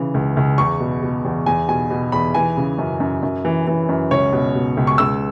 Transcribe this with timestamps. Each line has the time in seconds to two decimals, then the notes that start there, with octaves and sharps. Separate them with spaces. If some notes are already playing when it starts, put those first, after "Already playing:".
Already playing: C#3 E3
0.14 C#2
0.37 C#2
0.58 E2 C#6
0.80 B2
1.03 B2
1.25 E2
1.46 E2 G#5
1.68 B2 G#5
1.90 B2
2.12 E2 B5
2.35 E3 G#5
2.57 C#3
2.78 F#2
3.00 F#2
3.23 F#2
3.45 E3
3.67 E3
3.89 F#2
4.11 C#2 C#5
4.33 B2
4.55 B2
4.77 C#2
4.87 C#6
4.98 C#2 E6